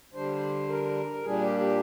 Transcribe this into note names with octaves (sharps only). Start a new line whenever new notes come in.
D3 G3 D4 C5
A#4
A#2 G3 D4 G#4
G4
G4